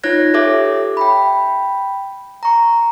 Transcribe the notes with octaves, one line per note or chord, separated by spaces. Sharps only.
D#4 F4 C#5 F#6 G#6 A#6
G4 A4 C#5 E5 D6
G5 B5
A#5 C#6